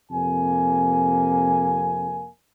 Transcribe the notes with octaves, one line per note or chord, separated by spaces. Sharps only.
F2 C3 A#3 G#5